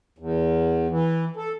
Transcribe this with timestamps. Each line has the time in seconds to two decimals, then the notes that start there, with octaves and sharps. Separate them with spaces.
0.18 E2
0.90 E3
1.36 A4